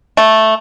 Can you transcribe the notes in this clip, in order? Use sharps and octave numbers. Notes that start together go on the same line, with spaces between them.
A3